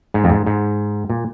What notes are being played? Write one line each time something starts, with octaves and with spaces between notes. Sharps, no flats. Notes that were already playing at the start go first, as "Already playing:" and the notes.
G#2
F2
G#2
G#2
A#2